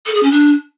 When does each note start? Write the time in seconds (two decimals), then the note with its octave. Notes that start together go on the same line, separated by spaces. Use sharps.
0.06 A4
0.15 G#4
0.23 C#4
0.31 D4